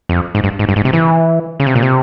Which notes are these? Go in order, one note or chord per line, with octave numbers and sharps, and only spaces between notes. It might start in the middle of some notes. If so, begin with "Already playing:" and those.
F2
G#2
G2
G#2
G2
G#2
C3
E3
C#3
C3
A#2
C3